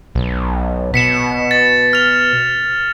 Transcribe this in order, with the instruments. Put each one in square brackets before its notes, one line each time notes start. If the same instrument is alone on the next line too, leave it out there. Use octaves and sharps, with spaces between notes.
[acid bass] B1
[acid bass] B2 [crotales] B6 C#7 E7
[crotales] A6
F6 F7